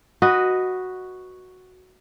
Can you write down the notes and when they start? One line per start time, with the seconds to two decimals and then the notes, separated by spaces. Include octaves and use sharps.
0.22 F#4 B4 D#5